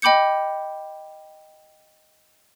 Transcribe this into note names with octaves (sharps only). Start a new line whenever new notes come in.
D#5 G5 B5 D6 G6 C#7